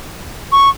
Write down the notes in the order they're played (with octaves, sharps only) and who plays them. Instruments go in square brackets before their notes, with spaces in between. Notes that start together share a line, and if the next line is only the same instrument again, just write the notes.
[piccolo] C#6